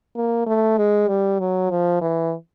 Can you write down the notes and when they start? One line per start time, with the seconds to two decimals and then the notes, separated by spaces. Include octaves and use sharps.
0.16 A#3
0.46 A3
0.77 G#3
1.08 G3
1.39 F#3
1.70 F3
2.01 E3